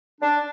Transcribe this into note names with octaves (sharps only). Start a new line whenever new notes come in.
D4